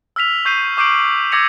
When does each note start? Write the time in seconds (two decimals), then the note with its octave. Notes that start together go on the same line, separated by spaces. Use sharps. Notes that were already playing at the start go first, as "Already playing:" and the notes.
0.16 E6 F6 B6 F7
0.45 C#6 G6 C7 D#7
0.77 C#6 D6 G6 C7 D7 F#7
1.32 D6 E6 G#6 A#6 C#7 F7